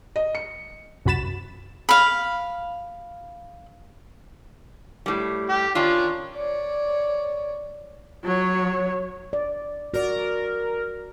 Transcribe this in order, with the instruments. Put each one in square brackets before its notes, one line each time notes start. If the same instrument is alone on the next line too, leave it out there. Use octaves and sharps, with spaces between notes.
[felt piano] D#5
C#7
[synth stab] C2 F#2 F#4 B5 A6 E7
[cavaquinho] F5 B5
[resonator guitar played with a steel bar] A2 G3
[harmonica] G4
[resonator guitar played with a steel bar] D#3 F4 [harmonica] C#4 D4
[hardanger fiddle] C#5 D5
[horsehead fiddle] F#3 C#5
[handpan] D5
[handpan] F#4 D5 [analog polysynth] A#4